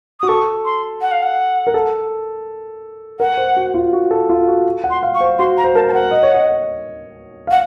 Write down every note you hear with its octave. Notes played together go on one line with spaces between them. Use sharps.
F#4 D#6
A4 C#6
C6
F#5
F5
F#5
A#4
A4
A#4 F#5
C5
F#4
F4
F#4
A4
F4
F#4
F#5
C6
F5
C#6
C5
F#4 C6
A#5
C5
A#4 A5
A5
C5 F#5
D#5
C#5
D#5
F5 F#5